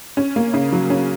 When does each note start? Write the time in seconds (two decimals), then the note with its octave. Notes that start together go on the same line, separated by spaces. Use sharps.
0.17 C#4
0.36 A#3
0.54 C#3
0.72 F#3
0.90 C#4